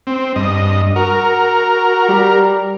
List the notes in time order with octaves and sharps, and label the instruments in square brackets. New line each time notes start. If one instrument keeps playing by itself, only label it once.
[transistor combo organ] C4
G2 D#5
[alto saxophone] F#4 [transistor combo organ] A#4
[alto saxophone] G3